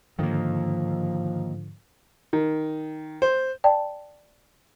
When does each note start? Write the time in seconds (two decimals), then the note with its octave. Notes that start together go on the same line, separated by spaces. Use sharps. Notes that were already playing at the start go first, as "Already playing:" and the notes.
0.19 G#2 D3 D#3 F3 A#3
2.33 D#3
3.22 C5
3.64 D5 G5 A5